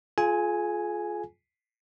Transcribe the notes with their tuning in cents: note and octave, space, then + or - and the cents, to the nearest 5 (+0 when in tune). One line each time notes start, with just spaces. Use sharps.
F4 +0 G#4 +40 G#5 +0